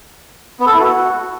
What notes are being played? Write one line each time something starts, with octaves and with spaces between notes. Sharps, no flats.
B3
A4
E4
F#4